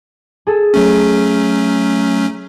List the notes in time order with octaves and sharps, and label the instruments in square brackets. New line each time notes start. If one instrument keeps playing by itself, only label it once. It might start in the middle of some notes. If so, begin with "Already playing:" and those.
[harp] G#4 A4
[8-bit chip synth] F#3 A3 C#4